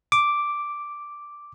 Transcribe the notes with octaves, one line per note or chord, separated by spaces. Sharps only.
D6